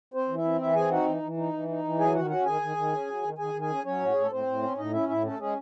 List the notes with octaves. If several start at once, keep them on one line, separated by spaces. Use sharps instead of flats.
C4 C5
E3
E4 E5
C4
E3 E4 E5
C4 G#4 G#5
D#4 F#4 F#5
E3
E3
D#4
E3
D#4
E3
F#3 G#4 G#5
D#3 F#4 F#5
C#4 F#4 F#5
D#3 G#4 G#5
D#3
D#3
C#4
F#3
D#3
D#3 G#4 G#5
D#3
G#4 G#5
C#4
F#3 C#4 C#5
A2 F#4
A2 G#4
A4
A2 C4 C5
A2
C#4
A2 D#4 D#5
C#4 E4 E5
A2 E4 E5
A3 C#4 A4
G#3 C#4 G#4